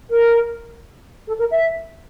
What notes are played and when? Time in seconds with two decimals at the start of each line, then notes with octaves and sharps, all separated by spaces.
0.09 A#4
1.27 A4
1.38 A#4
1.50 E5